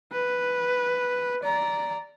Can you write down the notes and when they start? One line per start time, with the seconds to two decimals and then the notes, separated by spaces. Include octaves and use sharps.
0.12 B4
1.43 D5 A#5